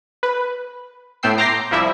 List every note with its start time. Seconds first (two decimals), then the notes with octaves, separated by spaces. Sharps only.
0.23 B4
1.23 A2 A3 B3 G5 E6 C7
1.38 A#5 C6 D6 G6 A#6 C7
1.71 C2 F3 G3 E4 E5